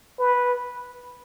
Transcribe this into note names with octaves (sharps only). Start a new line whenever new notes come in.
B4